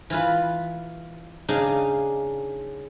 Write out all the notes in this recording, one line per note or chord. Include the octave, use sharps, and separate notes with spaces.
E3 F4 B4
C#3 D4 D#4 G#4 F5 A#5